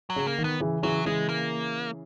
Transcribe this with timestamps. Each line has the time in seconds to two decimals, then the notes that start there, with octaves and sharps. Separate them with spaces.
0.10 F#3
0.16 C#3
0.27 A#3
0.38 D#3
0.44 B3
0.60 C#3 E3
0.83 C#3 E3 F#3
1.05 C#3 E3 G#3
1.29 A#3